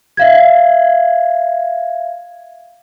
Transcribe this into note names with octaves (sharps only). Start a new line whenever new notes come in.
E5 F5 G#6